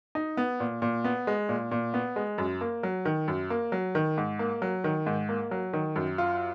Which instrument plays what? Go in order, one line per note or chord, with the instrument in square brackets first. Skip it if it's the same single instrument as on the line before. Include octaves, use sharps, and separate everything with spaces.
[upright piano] D#4
B3
A#2
A#2
B3
G#3
A#2
A#2
B3
G#3
F#2
A#3
F#3
D#3
F#2
A#3
F#3
D#3
G#2
A#3
F#3
D#3
G#2
A#3
F#3
D#3
F#2
F4